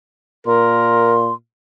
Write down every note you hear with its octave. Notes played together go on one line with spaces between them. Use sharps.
A#2 A#4 C6